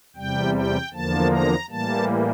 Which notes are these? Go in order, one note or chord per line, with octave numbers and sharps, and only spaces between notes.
E2 C3 G3 G5
G5
E2 D3 F3 A#3 A5
A#5
A2 E3 G3 A#3 A5